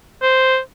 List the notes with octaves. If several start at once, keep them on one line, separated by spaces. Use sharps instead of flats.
C5